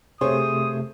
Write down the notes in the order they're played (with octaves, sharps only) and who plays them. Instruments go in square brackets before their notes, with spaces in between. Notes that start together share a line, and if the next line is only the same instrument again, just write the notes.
[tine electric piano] C3 A3 [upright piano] G#4 C5 C#5 [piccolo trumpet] D#6